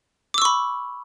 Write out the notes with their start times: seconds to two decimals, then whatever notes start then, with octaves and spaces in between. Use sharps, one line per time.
0.34 D6
0.38 E6
0.42 C#6
0.45 B5